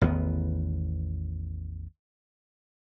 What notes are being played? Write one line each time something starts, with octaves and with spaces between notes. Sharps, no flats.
A1 E2 D#3 B3